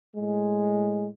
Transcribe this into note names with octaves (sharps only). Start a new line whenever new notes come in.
A2 G#3